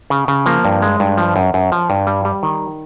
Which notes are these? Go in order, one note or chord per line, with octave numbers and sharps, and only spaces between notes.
C#3
C#3
F3 A#3
G2
G#3
G2
F3
F#2
F#2
F3
G2
G3
G3
D#3